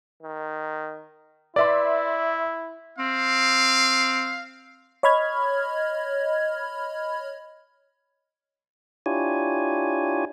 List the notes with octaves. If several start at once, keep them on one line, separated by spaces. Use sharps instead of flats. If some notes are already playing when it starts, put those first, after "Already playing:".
D#3
E4 B4 D5 E5 C6
C4 F5
C#5 D#5 B5 F6 G#6
D4 E4 F4 G4 C#5 G#5